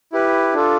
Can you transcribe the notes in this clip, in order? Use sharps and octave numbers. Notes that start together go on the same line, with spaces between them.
E4 G4 B4
D4 F4 A4